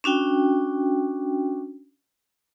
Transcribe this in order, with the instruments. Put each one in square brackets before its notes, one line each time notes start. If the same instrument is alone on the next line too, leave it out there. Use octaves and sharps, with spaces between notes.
[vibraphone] C#4 D4 F#4 G5